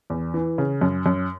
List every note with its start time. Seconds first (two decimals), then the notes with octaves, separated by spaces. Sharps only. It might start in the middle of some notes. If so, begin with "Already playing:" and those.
0.10 E2
0.34 E3
0.58 C#3
0.81 F#2
1.06 F#2